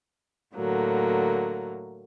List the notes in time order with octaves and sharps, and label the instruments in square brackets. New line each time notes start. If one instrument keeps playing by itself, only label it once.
[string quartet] A2 D3 F#3 A#3